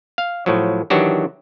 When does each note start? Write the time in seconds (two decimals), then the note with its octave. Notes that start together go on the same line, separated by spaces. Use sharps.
0.18 F5
0.46 A2 F3 F#3
0.90 D#3 E3 F#3 D4 F#4 G4